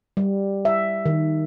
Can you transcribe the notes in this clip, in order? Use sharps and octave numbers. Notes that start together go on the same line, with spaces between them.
G3
E5
D#3